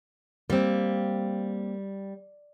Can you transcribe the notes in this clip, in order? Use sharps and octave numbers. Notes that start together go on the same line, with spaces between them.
G3 A#3 C4